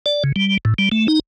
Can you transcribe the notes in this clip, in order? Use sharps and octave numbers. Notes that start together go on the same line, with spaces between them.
D5
C#3
G3
A2
G3
A3
D#4